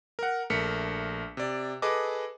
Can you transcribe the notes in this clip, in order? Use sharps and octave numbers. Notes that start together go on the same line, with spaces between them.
A#4 F#5
A#1 A3 A#4 B6 C#7
C3 D5
G#4 A4 B4 D#5 D6